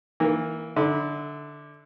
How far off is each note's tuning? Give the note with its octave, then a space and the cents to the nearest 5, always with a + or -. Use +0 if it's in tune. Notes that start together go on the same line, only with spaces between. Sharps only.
E3 -20 A#3 +0
D3 +0 E4 -30